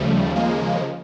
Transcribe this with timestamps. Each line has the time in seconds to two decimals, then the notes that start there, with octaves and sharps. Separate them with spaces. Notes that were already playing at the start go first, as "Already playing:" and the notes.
Already playing: D#2 C#3 F3 G3 A3
0.36 G#3 A#3